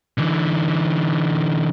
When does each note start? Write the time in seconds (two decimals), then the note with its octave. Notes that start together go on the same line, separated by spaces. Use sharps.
0.18 D3 E3